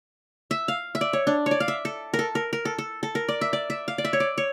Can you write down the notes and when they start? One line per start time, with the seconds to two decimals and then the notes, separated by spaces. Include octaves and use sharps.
0.51 E5
0.68 F5
0.95 E5
1.01 D5
1.13 C#5
1.27 D4
1.46 C#5
1.51 D5
1.60 F5
1.68 E5
1.85 A4
2.14 A#4
2.19 A4
2.35 A#4
2.53 A#4
2.65 A4
2.78 A4
3.03 A4
3.15 A#4
3.29 D5
3.41 E5
3.53 D5
3.70 E5
3.88 F5
3.98 D5
4.05 E5
4.13 C#5
4.20 D5
4.38 C#5